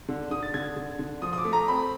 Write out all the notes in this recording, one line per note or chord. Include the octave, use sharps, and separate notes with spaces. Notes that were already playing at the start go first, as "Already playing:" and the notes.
D3
D3 D#6
A6
D3 G#6
D3
D3
F3 D#6
D#6
D6
A3
A#5
C4 B5